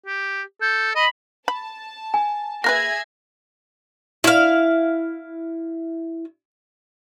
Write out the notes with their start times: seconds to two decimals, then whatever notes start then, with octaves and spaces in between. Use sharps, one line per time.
0.06 G4
0.61 A4 G6
0.95 D#5 B5
1.48 A5 B5
2.14 G#5
2.64 A#3 G#4 A#4 B4 E5 G#6 A#6
4.24 E4 F5